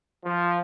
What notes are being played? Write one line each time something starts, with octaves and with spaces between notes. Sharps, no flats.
F3